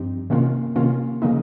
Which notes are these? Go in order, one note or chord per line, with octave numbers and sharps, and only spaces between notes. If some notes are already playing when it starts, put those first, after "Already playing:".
Already playing: G2 F3 C4 D#4 G4
C3 D#3 A#3 C#4 F4
C3 D#3 A#3 C#4 F4
C#3 F3 A#3 D#4